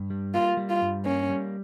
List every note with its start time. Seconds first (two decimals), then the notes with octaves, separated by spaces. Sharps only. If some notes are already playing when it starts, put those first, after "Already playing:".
Already playing: G2
0.10 G3
0.34 A#3 F4
0.57 G3
0.69 F4
0.82 G2
1.05 A#3 C#4
1.30 G3